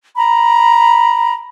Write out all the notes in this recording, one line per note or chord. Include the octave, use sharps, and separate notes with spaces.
A#5 B5